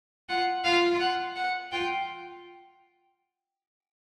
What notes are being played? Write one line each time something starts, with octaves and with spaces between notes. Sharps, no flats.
F4 F#5
F4 F5
F#5
F#5
F4 G5